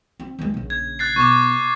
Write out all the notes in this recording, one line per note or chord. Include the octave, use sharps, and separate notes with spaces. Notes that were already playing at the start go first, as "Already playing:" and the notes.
C4
D#2 G#3
A#1 C#3
G#6
F#6 A6 C7
B2 C#6 D6